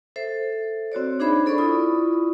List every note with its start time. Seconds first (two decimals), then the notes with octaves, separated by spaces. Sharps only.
0.16 A4 C5 E5
0.92 C4 F#4 C#5 D5
1.19 D4 D#4 G#4 C5 E5 B5
1.46 A4 D5 B5 C#6
1.58 E4 F4 D5 C#6 D#6